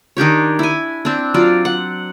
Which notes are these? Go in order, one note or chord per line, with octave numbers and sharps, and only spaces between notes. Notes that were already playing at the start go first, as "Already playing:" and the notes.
D#3 D4 G4 C#5
E4 G#5
C4 D4
F#3 F4 D5
F#5